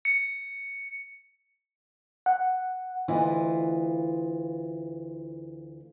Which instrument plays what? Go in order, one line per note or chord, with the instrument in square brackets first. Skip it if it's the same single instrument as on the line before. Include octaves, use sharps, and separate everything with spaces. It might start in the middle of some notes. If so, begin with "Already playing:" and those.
[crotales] C#7
[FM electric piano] F#5
[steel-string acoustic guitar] D2 E3 E4 F4 B4 D#5